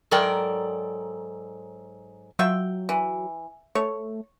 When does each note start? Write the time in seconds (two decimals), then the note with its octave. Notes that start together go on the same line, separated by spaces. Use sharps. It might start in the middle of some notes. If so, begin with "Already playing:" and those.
0.11 G#2 F#3 A4 A#4 D5 G5
2.39 F#3 F4 E5 G5
2.89 E3
3.75 A3 C#5